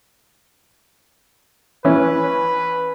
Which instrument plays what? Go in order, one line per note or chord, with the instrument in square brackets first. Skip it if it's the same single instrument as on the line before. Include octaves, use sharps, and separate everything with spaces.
[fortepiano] E3 C#4 [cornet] B4